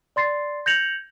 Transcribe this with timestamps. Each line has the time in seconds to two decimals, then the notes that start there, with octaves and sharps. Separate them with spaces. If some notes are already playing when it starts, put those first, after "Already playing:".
0.16 D5 C6 A6 C7
0.66 G6 G#6 A#6 C#7 F7 F#7